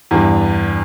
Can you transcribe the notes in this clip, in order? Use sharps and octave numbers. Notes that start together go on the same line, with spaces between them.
E2 G2